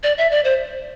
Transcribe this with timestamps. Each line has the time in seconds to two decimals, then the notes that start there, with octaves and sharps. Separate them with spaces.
0.03 D5
0.18 E5
0.31 D5
0.44 C5